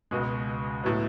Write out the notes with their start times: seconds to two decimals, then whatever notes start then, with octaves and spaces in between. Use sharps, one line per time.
0.11 C#2 B2 G#3
0.84 A2 F#3 B3